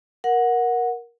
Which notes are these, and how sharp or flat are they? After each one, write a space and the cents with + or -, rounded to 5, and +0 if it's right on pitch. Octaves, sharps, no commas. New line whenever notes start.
A#4 +15 F#5 -10